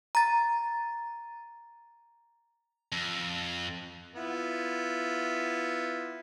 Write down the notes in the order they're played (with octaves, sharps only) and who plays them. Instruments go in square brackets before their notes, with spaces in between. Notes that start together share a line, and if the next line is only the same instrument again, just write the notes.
[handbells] A#5 A6
[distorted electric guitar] F2
[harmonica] B3 E4 F4